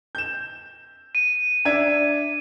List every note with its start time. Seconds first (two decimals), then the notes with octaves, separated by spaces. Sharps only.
0.15 G6 E7
1.15 D#7
1.65 D4 E5 G#6